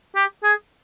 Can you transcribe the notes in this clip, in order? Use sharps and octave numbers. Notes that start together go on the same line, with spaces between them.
G4
G#4